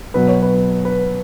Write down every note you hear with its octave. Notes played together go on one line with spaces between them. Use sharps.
B2 F#3 B4
C#5
B4
B4